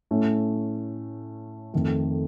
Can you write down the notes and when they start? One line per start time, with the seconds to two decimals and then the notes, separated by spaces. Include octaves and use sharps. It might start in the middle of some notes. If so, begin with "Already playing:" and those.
0.11 A2 A3 C#4
1.74 F2 D#3 A3